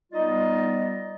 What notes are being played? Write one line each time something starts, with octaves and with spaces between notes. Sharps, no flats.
G3 B3 D#4 F4 D5 D#5